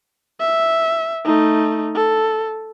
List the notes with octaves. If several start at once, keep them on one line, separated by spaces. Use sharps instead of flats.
E5
A3 D#4
A4